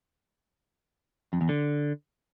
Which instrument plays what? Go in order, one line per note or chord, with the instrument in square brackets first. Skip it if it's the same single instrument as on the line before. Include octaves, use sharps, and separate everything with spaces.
[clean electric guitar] F2
E2
D3